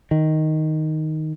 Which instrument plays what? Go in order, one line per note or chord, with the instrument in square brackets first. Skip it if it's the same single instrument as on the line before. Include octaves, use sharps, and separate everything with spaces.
[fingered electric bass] D#3